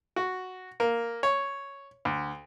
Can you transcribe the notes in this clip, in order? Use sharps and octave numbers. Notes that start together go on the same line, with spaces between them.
F#4
A#3
C#5
D2